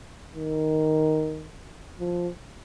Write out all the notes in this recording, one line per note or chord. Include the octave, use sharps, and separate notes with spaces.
D#3
F3